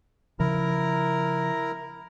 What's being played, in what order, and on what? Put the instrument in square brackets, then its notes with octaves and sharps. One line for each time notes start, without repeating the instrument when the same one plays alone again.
[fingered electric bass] C#3 F3 [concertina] E4 A#4 A#5